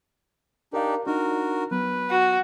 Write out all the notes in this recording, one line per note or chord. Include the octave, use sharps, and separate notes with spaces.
D4 D#4 G4 A#4 F5
D4 D#4 F#4 A#4
F#3 B3 B4
F#4